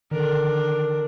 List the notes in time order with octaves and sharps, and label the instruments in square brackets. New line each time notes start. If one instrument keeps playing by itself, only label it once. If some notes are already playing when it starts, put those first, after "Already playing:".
[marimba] D3 A4 [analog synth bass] D#3 [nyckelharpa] D4 A#4